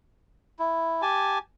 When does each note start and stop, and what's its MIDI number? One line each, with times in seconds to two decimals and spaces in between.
0.59 1.02 64
1.02 1.38 67
1.02 1.38 80
1.02 1.38 81